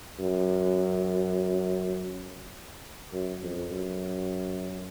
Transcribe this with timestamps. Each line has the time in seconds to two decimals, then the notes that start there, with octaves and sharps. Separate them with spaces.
0.20 F#2
3.13 F#2
3.43 F2
3.72 F#2